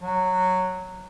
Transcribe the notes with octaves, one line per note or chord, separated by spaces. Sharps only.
F#3